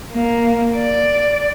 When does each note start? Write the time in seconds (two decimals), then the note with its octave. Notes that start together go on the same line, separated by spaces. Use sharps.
0.14 A#3
0.76 D5